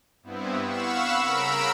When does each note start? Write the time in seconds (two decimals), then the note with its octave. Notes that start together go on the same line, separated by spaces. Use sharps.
0.23 G2 B3 C4 E4
0.63 F5 F#5 B5 C#6 E6 E7
1.20 C#3 A#4 A#5 B5 E6 D7